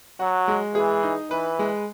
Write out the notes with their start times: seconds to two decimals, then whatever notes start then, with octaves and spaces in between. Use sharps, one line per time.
0.20 F#3 F#4
0.48 G#3
0.75 E3 G#4
1.03 D#4
1.31 E3 B4
1.59 G#3